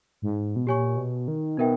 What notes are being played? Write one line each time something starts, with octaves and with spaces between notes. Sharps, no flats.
G#2
B2
A#2 G4 C#5 G#5 C#6
B2
D#3
B2 D#4 A#4 E5 G5